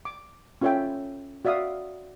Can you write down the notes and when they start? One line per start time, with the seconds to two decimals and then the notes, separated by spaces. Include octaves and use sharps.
0.05 D6
0.61 C#4 F4 A4 C#5 E5 G5
1.45 F#4 D5 E5 F5 D#6